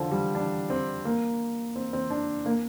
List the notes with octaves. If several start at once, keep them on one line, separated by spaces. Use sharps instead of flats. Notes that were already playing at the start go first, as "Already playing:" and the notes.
Already playing: D3 F3
G3
D4
C4
A#3
C4
C4
D4
A#3